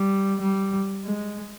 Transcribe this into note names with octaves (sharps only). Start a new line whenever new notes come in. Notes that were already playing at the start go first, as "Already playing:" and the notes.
Already playing: G3
G3
G#3